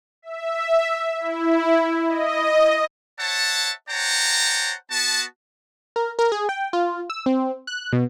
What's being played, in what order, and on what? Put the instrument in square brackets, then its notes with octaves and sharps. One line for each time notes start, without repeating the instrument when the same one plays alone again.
[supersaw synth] E5
E4
D#5
[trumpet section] C5 C#5 E5 F#5 A5
C5 C#5 F#5 G5 A5 A#5
B3 F#4 A5
[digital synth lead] A#4
A#4
G#4
G5
F4
E6
C4
F#6
B2